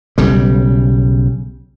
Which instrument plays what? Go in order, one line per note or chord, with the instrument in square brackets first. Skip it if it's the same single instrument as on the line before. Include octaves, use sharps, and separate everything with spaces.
[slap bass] B1 C#3 G3